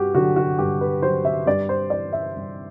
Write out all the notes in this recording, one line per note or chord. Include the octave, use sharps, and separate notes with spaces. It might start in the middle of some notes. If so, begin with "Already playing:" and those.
Already playing: G2 F#4 G4
D3 F#3 F#4
F#4
G2 G4
B4
D3 F#3 C5
E5
G2 D5
C5
E3 G3 D5
E5
G2